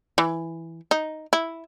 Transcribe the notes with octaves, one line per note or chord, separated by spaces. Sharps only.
E3
D#4
E4